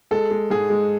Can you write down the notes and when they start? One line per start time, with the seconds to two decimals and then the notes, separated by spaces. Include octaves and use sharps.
0.11 G#3 A4
0.31 G#3
0.50 G#2 G#4
0.70 G#3